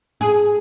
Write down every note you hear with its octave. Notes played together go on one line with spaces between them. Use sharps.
G#4